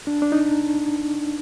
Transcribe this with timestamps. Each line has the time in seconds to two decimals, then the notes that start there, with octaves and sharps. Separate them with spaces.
0.07 D4
0.22 D4
0.32 D#4